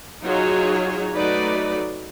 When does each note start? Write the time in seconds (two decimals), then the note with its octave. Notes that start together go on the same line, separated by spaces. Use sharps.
0.24 F#3 D#4 F4 G#4 C#5
1.14 F#3 A3 D#4 B4 D5